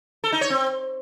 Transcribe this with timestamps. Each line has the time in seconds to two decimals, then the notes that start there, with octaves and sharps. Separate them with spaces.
0.24 A4
0.32 D#4
0.41 C#5
0.50 C4